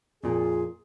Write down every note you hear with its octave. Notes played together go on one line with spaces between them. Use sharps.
F2 A#2 F4 G#4